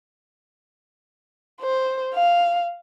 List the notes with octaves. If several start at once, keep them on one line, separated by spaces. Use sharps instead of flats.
C5
F5